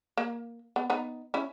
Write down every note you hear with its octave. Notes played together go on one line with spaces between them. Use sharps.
A#3
B3
B3 D#4
C#4 E4